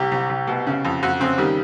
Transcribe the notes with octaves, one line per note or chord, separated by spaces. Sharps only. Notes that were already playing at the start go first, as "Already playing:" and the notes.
Already playing: C2 G4
C2
C2
B2
C#3
F2
F2 F#4
C#3 C4
D#3 G3